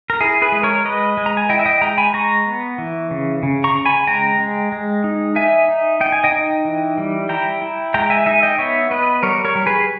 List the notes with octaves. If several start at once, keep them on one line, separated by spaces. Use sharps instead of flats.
A#4
E4 G#4
G#4 B4
G#3
A#4 C#5
G#3 B4 D#5
G#3
A#5
G#5
E4 D#5 G5
E5
D#5 G5
G#3 G5 A#5
G#5 B5
G#3 A#5 C#6
B3
E3
C#3
C#3
A#5 C#6
C#3
G#5 B5
G#3 G5 A#5
G#3
G#3
D#4
D#4 E5 G#5
D#4
D#4 G5
G#5
D#5 G5
D#4
E3
G3
E4 G5 A#5
E4
G#3 G5 A#5
E5 G#5
D#4 E5 G#5
D#5 G5
B3 C#5 E5
B3 B4 D#5
G3 A#4 C#5
A#4 C#5
G3
G#4 B4